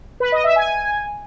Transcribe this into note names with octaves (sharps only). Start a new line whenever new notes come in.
B4
D#5
E5
G#5